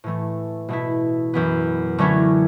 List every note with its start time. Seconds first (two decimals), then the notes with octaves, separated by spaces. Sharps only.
0.04 A2 E3 A3
0.69 B2 A3 E4
1.34 F#2 E3 B3
1.98 D3 F#3 A3 C#4 E4